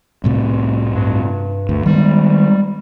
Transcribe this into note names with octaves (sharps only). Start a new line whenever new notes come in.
C2 A2 C3
G2
D2
D#3 G3 G#3 B3